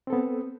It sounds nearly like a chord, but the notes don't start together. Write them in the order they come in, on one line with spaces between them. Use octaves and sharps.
C4 A4 B3